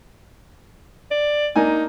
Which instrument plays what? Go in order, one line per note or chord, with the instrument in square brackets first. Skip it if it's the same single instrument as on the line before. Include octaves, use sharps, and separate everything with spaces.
[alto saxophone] D5
[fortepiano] A#3 D4 G#5 [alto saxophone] D#4